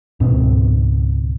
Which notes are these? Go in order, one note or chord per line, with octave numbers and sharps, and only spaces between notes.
C#2 G#2 B2 C4